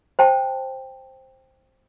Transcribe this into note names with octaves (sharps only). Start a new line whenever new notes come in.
C5 G5 A5